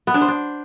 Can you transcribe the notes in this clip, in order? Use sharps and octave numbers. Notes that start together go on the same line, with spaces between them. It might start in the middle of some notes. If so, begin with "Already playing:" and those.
B3
D4
C5
D4